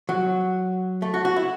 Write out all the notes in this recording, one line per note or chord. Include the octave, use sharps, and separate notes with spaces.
F#3
A3
F#4
F#4
E4